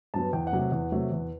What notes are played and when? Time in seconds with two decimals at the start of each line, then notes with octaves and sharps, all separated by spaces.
0.14 G2 F#3 B3 A5
0.33 E2 G5
0.47 F#5
0.53 C3 F#3 A3
0.59 F#5
0.72 E2
0.92 C3 F#3 A3
1.12 E2